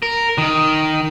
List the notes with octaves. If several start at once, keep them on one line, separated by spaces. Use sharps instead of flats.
A#4
D#3